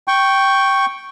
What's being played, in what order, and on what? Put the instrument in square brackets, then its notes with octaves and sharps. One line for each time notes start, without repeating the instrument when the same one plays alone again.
[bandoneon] G5 C#6